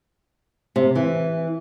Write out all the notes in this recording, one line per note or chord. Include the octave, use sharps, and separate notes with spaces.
C3
E3